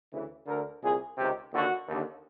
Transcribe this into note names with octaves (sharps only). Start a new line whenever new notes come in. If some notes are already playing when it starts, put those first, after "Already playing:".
D2 C#3 E3
D2 D3 A#4
C2 A#2 G#4
C#2 C3 D#3 G4
D#2 D3 F#4
D#2 D3